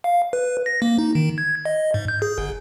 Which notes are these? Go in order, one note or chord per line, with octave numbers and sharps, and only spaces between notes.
F5
B4
A#6
A#3
D#4
D#3
G#6
D#5
G#2
G6
G#4
G1